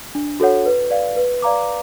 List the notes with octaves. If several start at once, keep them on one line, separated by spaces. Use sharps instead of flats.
D4
F#4 A4 C#5 F#5
B4
D5 F5
B4
D5 F5 A#5 D6